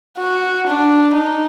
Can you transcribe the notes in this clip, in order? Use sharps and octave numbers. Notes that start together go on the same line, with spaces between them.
F#4
D4
D#4